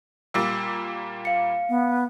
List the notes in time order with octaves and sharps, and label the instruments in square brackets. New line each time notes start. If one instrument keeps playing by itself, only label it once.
[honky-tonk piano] A#2 G3 A#3 [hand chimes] E6
[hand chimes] F5 C#7
[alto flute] B3